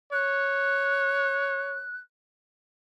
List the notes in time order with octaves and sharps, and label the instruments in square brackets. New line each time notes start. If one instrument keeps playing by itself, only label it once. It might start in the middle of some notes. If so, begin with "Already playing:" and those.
[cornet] C#5 [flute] F#6